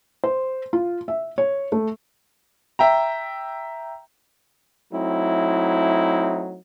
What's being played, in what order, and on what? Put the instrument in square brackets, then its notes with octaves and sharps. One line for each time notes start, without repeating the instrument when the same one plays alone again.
[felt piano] C5
F4
E5
C#5
A3
[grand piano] E5 G5 A#5
[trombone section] F#3 A3 C4 D#4 E4